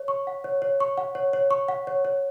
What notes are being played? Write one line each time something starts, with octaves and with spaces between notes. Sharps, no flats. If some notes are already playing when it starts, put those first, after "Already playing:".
Already playing: C#5
C#6
F#5
C#5
C#5
C#6
F#5
C#5
C#5
C#6
F#5
C#5
C#5